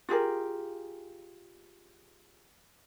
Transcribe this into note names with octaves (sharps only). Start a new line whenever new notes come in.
F4 G4 G#4 A#4